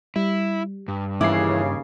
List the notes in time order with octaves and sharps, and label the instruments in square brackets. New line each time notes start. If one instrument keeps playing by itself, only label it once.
[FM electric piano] G3 [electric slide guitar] E4
[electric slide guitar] G2
[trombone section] D#2 C#3 [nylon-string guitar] E3 E4 [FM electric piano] D6 G#6 C7